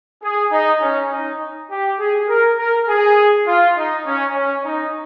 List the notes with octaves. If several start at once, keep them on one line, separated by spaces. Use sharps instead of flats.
G#4
D#4
C#4
D#4
G4
G#4
A#4
A#4
G#4
F4
D#4
C#4
C#4
D#4